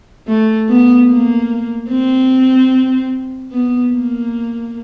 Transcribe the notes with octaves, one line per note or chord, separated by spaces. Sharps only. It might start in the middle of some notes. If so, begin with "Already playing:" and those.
A3
B3
A#3
C4
B3
A#3